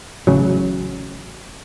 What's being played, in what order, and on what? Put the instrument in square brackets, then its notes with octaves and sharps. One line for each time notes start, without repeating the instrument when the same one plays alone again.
[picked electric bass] A1 C#3 F#3